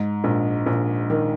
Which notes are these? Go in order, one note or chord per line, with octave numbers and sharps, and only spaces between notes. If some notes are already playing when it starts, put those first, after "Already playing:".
Already playing: G#2
A#1
A#1
D#3